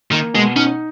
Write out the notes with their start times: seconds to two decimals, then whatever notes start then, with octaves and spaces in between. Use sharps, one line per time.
0.12 D#3 A#3
0.34 B2 G#3
0.56 C#4 D#4